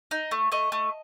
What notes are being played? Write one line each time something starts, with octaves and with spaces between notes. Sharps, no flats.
D#4
A3
A3 D#5
A3